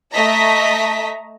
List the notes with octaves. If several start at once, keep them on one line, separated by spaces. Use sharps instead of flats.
A3 D#5 E5 A5 A#5 B6